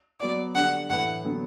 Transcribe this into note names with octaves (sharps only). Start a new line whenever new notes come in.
F#3 B3 F#4 D5
D3 G3 D4 F#5
A2 E3 A3 E4 B4 F#5
D3 F#3 B3